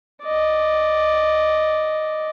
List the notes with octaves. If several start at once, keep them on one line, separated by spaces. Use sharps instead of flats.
D5 D#5